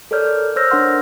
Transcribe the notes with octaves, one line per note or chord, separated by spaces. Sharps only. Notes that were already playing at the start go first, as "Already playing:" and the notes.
A4 A#4 C#5 D5 F6 G6
C5 C#5 E6 F6 G6 A#6
D4 A#4 C#5 F#5 C6 F6